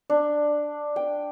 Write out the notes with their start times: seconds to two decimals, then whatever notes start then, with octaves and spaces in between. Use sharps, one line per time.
0.10 D4
0.96 G5